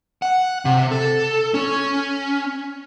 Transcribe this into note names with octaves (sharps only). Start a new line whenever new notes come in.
F#5
C3
A4
C#4